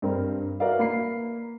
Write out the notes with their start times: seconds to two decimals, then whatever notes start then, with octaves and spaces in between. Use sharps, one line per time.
0.02 G2 C4 A#4
0.60 F#4 A#4 B4 D5 E5 F5
0.79 A#3 B5 C7